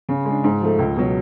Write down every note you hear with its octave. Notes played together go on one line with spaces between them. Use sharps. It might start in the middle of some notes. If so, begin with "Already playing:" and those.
C#3
G#3 D4
G#2
F3 A3
C#2
B2 F#3